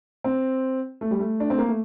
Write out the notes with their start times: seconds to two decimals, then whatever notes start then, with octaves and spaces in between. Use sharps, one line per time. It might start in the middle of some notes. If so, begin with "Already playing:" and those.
0.24 C4
1.01 A3
1.11 G3
1.20 A3
1.40 D4
1.50 C4
1.58 A#3
1.68 A3